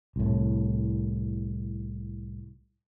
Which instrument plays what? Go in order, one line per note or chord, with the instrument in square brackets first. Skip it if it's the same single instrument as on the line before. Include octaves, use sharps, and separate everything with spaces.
[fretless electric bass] C2 A2